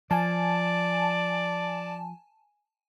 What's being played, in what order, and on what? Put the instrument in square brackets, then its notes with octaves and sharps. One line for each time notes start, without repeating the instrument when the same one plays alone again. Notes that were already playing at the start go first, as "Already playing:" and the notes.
[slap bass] F3 [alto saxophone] D5 [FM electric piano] G#5 A5